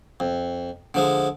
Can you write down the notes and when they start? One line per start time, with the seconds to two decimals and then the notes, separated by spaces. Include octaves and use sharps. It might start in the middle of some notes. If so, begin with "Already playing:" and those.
0.20 F2
0.94 D3 F3 G#3